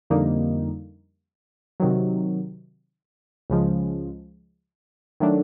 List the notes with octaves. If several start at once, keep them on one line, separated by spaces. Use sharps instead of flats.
F2 D3 G3 A#3 D#4
C3 D#3 F#3
C#2 C#3 F3 G#3
D#3 F#3 A3 D4